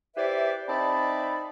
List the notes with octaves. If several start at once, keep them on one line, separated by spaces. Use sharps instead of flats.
E4 G4 B4 C5 D5 E5
C4 D#4 D5 E5 A5 B5